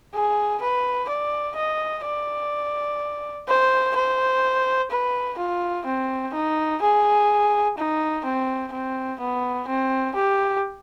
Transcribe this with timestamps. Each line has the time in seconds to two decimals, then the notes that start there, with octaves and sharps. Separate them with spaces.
0.14 G#4
0.62 B4
1.09 D5
1.56 D#5
2.05 D5
3.48 C5
3.95 C5
4.91 B4
5.38 F4
5.86 C4
6.34 D#4
6.82 G#4
7.78 D#4
8.25 C4
8.73 C4
9.20 B3
9.68 C4
10.16 G4